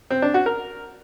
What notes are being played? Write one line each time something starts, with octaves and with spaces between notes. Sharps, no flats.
C4
D4
F#4
A#4